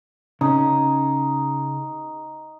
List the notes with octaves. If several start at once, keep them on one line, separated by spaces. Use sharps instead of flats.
C#3 C#4 D#4